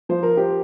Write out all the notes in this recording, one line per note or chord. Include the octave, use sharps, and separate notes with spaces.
F3 C5
A#4
G4 C5